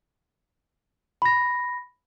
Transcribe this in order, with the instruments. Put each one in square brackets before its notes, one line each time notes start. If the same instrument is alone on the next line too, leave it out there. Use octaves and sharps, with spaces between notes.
[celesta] B5 A#6